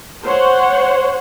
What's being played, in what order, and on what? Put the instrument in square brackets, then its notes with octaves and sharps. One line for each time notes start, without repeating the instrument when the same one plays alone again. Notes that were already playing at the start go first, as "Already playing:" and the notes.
[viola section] C5 C#5 F#5